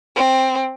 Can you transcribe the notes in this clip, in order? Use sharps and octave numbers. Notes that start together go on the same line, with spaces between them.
C4